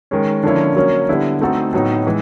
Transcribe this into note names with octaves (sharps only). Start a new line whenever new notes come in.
D#3 G#3 C#4
D3 F3 A#3 C#4 E4
F#3 A#3 C#4
D3 G3 B3 E4
A3 C4 D#4 F#4 A4
A2 F#3 B3 D#4
E3 G#3